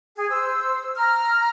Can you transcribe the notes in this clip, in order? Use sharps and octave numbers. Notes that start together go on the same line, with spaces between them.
G#4
C5 E6
A#5 F6